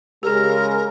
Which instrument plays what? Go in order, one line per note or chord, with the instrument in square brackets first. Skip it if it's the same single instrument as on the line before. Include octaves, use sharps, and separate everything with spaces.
[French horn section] C#3 G#3 [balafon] G4 G#4 [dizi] A#4